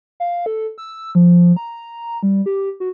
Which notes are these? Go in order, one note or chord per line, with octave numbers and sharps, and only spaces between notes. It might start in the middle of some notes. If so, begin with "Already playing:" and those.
F5
A4
E6
F3
A#5
G3
G4
F#4